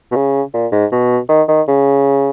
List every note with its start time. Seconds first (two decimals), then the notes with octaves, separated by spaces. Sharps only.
0.12 B2
0.16 C#3
0.54 A#2
0.72 G#2
0.92 B2
1.29 D#3
1.49 D#3
1.68 C#3